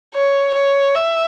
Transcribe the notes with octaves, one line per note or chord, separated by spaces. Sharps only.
C#5
C#5
E5